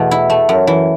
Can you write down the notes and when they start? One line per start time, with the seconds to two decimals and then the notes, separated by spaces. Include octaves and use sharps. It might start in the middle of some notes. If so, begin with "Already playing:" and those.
Already playing: E2 B2 A3
0.11 E4
0.30 A3
0.49 F#2
0.67 E3